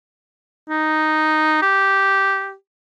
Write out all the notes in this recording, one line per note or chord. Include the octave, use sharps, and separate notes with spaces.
D#4
G4